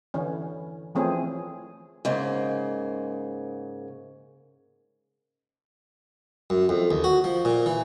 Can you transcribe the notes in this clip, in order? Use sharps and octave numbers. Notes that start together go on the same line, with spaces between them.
D3 E3 C#4
E3 F3 A3 C4 C#4 G#4
G#2 C#3 A#3
F#2
F2
D#2
F#4
F3
A#2
E3